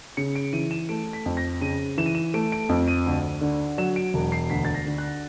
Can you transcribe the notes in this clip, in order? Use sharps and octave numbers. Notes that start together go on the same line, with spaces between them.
C#3 C#7
D7
E3 D#7
E7
A3 D7
B6
F2
A#6
C#3 D#7
E3 E7
D#7
E7
A3 D7
D7
F2
D#7
D2
D3
F#3 E7
D7
E1
C7
D2 B6
A6
A#6
D3
F#6